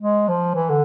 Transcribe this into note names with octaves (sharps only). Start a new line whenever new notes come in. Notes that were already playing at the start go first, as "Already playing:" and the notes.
G#3
F3
E3
D3